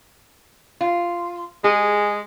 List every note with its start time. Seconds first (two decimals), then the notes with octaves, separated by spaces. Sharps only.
0.81 F4
1.64 G#3 G#4